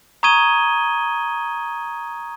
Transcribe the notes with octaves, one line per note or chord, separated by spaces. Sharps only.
A#5 C#6 D#6 G#6 D#7 G7